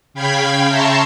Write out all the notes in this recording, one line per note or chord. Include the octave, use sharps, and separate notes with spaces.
C#3 F5 G5 B5 G#6 B6
E5 A5 A#5 C6 C#6 E6